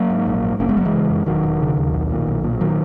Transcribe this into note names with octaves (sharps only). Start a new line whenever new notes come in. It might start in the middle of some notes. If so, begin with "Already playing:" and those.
Already playing: F#3 A#3
G#2
A#1
G#2
F#1 A#3 C#4
G#3 B3
F#1 F#3 A#3
E3 G#3
C#3
F#2
E1 D#3 F#3
E1
C#3
D#2
B1
A#2
B1
A#2
D#3 F#3